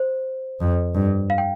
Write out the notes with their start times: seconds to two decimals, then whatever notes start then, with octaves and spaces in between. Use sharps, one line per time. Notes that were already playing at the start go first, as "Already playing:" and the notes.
Already playing: C5
0.60 F2
0.95 G2
1.30 F5
1.38 G5